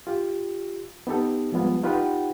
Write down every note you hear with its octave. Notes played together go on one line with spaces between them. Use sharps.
F4 G4
B3 D#4 G4 A4
F3 G3 G#3 B3 F4
D#4 F4 G4 B4 F#5 G5